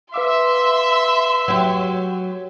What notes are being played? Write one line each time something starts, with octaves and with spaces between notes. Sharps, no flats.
B4 E5 F5 C6 D6
F#3 G4